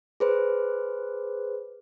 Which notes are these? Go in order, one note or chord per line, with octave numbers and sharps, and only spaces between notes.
G#4 B4 C5